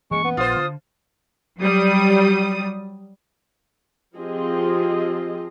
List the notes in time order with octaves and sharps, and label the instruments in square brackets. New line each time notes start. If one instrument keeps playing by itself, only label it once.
[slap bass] E3 A#3 C#4 [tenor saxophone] G#3 [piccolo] C#6
[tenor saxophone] B3
[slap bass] A#1 [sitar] F4 C5 [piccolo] D#6
[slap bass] D3
[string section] F#3 G3 D#6
[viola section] F3 C4 F4 G4 G#4 D#5